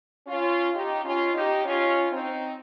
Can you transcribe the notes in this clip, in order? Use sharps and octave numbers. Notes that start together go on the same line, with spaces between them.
C#4 F4
D#4 G4
C#4 F4
D#4 G4
C#4 F4
C4 D#4